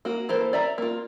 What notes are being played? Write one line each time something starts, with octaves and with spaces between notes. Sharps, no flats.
A#3 F#4
E3 A#3 A4 C5
D5 E5 A#5
A#3 F4